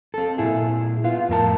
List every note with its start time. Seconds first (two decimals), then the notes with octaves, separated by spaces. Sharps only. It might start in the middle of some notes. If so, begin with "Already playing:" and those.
0.14 C4 A4
0.38 A#2 E4 G#4
1.04 B3 F4
1.28 F2 A2 A#4 A5